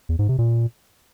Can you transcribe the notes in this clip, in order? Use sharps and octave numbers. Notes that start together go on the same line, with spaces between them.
E2
G#2
C3
A#2